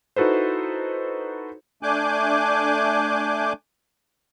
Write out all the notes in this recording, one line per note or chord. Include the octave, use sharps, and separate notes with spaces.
D#4 E4 F#4 A4 B4 C5
A3 D4 G#5 D6 F#6 G6